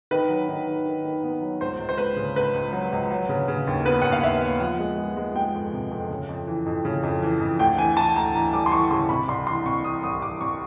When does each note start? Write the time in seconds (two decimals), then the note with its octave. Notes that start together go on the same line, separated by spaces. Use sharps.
0.11 D#3 B4
0.29 F#3
0.49 D#3
0.67 D#3
0.86 D#3
1.05 D#3
1.24 B3
1.41 F#3
1.61 C#2 C5
1.79 C#2
1.89 C5
1.98 C#2 B4
2.16 C#3
2.36 C#2 B4
2.54 C#2
2.73 F#3
2.92 C#2
3.11 F#3
3.29 C#3
3.48 C#3
3.67 D#2
3.86 B3 B4
4.02 D#2 F#5
4.12 F5
4.23 D#2 E5
4.42 B3
4.60 F3 F#5
4.79 G#3
4.98 G#3
5.17 G#3
5.36 G#3 G5
5.54 F2
5.73 C3
5.91 F2
6.10 C#3
6.29 F2
6.47 E3
6.66 F2
6.85 C#3
7.03 F2
7.22 E3
7.41 F2
7.59 D2 G5
7.78 E3 G#5
7.97 E3 A5
8.16 D2 A#5
8.35 E3 A#5
8.53 G3 D6
8.66 C6
8.72 E3 C#6
8.91 C#3 C6
9.09 C3 B5
9.28 C2 C6
9.47 E3 C6
9.65 C3 C#6
9.84 E3 D#6
10.03 C2 D#6
10.22 C2 D6
10.41 C2 C#6